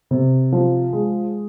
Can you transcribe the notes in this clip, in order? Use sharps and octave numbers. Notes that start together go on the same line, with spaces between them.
C3
F3
G#3